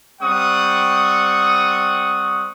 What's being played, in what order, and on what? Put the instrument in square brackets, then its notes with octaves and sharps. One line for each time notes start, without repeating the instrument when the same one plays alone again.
[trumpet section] G3 C4 F#5 C#6 D#6